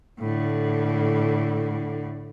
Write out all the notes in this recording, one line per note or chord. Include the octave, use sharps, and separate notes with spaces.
A2 D3